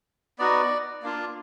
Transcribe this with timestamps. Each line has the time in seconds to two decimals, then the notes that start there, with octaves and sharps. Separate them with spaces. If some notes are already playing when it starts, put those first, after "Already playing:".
0.39 B3 D#4 F#4 D5
1.03 A#3 D4 F4